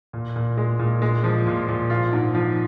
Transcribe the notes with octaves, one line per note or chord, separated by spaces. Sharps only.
A#2
A#2
G#3
A#2
G#3
F3
A#2
A#2
F4
G#2
F3